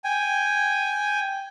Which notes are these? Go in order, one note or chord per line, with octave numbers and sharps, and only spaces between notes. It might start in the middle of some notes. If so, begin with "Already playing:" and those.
G5 G#5